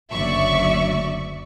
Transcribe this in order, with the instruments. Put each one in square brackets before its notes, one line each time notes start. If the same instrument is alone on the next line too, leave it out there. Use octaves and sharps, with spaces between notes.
[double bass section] F#1 D2 F#3 [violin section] D5 E5 C#6